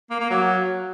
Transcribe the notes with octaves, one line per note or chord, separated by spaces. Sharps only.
A#3
A#3
F#3